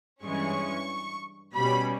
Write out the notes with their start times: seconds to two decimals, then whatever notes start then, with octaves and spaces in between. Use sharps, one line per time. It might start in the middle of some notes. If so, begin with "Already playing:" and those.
0.23 G2 E3 G#3 C#4 C#6
1.56 B2 G3 C#4 B5